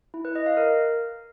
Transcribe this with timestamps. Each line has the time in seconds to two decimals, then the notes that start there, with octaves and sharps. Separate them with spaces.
0.14 E4
0.25 B4
0.35 D#5
0.46 F5
0.57 A#4